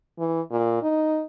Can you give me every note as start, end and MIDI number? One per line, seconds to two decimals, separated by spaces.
0.19 0.41 52
0.51 0.79 46
0.82 1.24 63